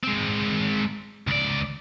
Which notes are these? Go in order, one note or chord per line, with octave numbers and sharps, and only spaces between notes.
G#3 C4
C#2 D5